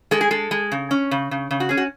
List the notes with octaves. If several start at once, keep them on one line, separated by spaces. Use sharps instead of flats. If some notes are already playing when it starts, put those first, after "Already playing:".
G#3 A4
G#4
G#3 A4
G#3
C#3
C#4
C#3
C#3
C#3
F#4
C#4 G#4
F#4